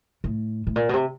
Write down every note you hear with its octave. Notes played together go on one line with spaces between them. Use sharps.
A2
A2
A#2
B2
C3